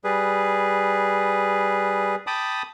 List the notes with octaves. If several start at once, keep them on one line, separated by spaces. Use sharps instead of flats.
G3 G#4 B4
G5 A5 B5 D6 D#6